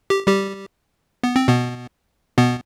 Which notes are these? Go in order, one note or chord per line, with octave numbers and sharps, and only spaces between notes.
G4
G3 G4
B3
C4
B2 B3
B2 B3